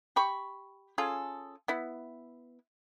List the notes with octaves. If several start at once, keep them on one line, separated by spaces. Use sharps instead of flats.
G4 B5 C#6
C#4 F4 G#4 A4
B3 E4